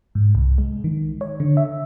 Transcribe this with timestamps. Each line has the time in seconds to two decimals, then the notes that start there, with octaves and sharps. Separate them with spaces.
0.15 G#2
0.35 C2
0.58 G#3
0.84 D#3
1.21 C#5
1.40 D3
1.57 E5